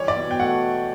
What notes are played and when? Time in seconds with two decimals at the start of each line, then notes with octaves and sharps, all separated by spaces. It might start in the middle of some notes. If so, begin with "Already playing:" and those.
Already playing: E3 G3 C#5
0.08 D5
0.16 B2
0.31 G5
0.39 A3 F#5